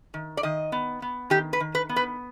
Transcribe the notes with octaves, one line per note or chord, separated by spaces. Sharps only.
D#3
D5
D#3 D#5
B3
B3
D#3 G4
B4
D#3
B4
B3
B4